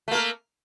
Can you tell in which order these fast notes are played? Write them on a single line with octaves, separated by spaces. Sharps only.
A3 A#3 A#4